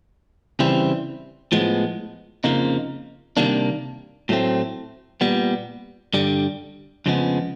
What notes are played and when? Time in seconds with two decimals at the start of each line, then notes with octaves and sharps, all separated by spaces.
0.59 C#3 E3 G3 C4 E4
1.52 A2 F3 G#3 B3
2.44 F2 C#3 F3 A#3 D#4
3.37 C3 D#3 G3 A#3 D4
4.29 A2 F#3 A3 C4
5.21 A#2 G3 B3
6.14 G2 D3 G3
7.06 F2 C#3 F3 G#3 B3